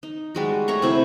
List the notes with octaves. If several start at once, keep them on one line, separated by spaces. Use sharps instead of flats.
D#4
G3 G#3 F#4
A3 C#5 A#5 C#6
C3 E4 C#6